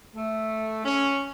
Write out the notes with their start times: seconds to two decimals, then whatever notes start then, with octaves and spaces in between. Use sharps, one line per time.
0.15 A3
0.85 C#4